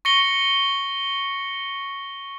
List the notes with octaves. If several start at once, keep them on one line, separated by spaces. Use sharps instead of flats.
C#6 A#6 C#7 G7